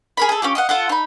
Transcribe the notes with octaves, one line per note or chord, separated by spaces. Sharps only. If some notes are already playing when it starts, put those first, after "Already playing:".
G#4 A#4 B5
G#4 A4
C#4 F4 G4
D#5 F5 F#5
F4 A4 F#5
D#4 B5